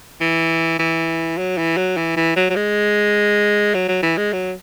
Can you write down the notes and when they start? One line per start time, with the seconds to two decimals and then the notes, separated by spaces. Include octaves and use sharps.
0.21 E3
0.80 E3
1.38 F#3
1.58 E3
1.77 F#3
1.97 E3
2.17 E3
2.36 F#3
2.50 F#3
2.56 G#3
3.74 F#3
3.89 F#3
4.03 E3
4.18 G#3
4.33 F#3